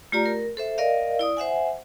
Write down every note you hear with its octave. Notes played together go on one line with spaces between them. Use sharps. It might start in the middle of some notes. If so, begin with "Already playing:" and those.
A3 F4 G4 D5 A#5
A#4
A4 C5 E5
A#4 D5 D#5 F5
E4 D5 D#6
C5 E5 F#5 G#5